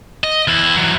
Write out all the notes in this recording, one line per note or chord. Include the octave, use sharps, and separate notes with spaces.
D#5
E2 E4
E3 F#3